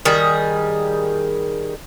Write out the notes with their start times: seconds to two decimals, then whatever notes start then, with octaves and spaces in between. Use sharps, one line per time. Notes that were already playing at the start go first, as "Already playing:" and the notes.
0.05 D#3 G3 G#4